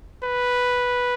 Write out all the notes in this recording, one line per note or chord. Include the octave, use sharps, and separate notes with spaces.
B4